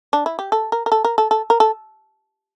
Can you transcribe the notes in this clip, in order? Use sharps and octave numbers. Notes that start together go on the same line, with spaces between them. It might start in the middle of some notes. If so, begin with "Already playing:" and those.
D4
E4
G4
A4
A#4
A#4
A4
A#4
A4
A4
A#4
A4